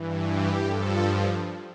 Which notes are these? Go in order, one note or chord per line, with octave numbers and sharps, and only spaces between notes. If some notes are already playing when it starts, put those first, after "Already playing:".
Already playing: G2 E3
G4
G2 F3 A4